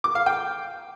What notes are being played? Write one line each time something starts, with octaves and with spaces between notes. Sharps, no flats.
D6
F5
G5